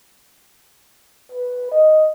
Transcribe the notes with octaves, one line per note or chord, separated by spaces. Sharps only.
B4
D#5